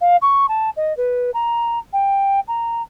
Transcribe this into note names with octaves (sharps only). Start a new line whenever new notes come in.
F5
C#6
A5
D#5
B4
A#5
G5
A#5